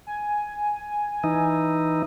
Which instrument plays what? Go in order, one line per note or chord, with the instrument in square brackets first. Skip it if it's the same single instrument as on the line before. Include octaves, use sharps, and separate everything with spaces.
[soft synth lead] G#5
[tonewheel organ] E3 D#4